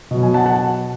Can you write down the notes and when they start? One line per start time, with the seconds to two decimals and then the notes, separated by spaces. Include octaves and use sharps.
0.11 B2 F#3
0.23 G#5
0.34 F#5 A5
0.46 F#5 A5